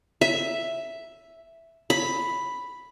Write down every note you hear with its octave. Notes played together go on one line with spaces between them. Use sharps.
E5
B5